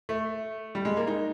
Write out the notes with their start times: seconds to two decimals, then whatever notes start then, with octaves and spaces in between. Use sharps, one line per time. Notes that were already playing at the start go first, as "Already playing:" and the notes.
0.09 A3
0.75 G3
0.85 G#3
0.97 A#3
1.07 D#4